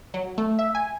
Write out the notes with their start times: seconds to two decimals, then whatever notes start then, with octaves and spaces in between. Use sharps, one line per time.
0.14 F#3
0.38 A3
0.59 E5
0.75 G#5